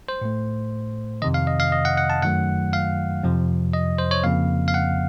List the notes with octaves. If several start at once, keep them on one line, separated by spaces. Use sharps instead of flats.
C5
A2 A3
F2 C3 D#3 D#5
F5
D#5
F5
D#5
F#5
F#5
A5
F#2 D#3 F#3 A3 F#5
F5
F2 C3 F3
D#5
C5
C#5
F2 C#3 F3 A#3 F5
F5
F#5